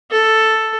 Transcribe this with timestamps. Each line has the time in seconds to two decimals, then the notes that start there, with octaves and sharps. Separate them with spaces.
0.11 A4